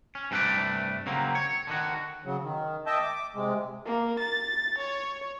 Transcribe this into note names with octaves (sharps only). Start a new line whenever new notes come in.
C#4
G2 C3 A3 F4 B4 D5
C#3 F#3 A#3 C4
C#5
D3 D#3 F#4
C#3 F#3
D#3
D#5 E5 G5 A5
D6
C3 G#3
A#3
A6
C#5